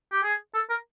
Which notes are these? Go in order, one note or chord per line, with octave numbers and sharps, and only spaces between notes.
G4
G#4
A4
A#4